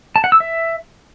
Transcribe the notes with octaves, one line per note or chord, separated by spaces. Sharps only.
A5
F#5
E6
E5